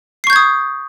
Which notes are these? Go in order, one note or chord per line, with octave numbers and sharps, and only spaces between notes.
C#6 D#6 G6 G#6 C7